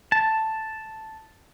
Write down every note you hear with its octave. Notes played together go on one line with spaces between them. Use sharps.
A5